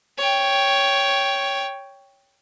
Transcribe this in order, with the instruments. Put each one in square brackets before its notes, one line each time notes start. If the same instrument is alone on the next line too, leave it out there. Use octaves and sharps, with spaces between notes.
[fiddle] C#5 G5